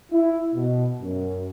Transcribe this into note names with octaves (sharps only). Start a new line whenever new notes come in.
E4
B2
F#2